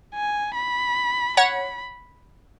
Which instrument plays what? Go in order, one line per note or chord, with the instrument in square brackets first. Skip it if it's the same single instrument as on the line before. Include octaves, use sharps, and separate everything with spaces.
[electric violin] G#5
B5
[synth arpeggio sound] C#5 F#5 [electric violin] B5